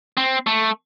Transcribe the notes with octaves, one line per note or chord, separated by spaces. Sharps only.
C4
A3